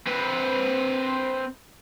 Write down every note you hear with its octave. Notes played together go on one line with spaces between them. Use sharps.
C4 B4